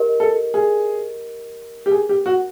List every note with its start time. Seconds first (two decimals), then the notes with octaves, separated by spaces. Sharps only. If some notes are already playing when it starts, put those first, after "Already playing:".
Already playing: G4 A#4 D#5
0.20 A4
0.54 G#4
1.86 G4
1.91 G#4
2.09 G4
2.26 F#4